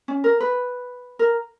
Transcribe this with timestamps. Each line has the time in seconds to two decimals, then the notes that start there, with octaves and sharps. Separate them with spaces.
0.08 C#4
0.24 A#4
0.40 B4
1.19 A#4